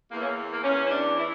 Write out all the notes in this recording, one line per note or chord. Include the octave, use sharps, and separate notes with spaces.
E2 E3 A#3
C#4
A#3
A#3
E2 E3 C#4
E4
D4
E3 E4